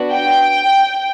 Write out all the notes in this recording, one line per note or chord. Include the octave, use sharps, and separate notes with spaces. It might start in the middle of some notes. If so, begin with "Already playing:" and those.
Already playing: B3 D4 F#4
G5